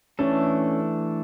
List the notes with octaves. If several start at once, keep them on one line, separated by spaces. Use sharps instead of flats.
E3 A3 C#4 D4 A4